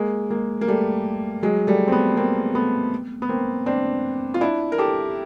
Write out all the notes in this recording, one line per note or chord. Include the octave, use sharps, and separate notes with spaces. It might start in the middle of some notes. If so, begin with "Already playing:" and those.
Already playing: G#3 A#3
G#3 A#3
A#3
G3 A3
F#3 G#3
G3 A3
C4
A3 B3
A#3 C4
A3 B3
B3
A#3 C4
C4 D4
F4
D4 E4
A#4
G4 A4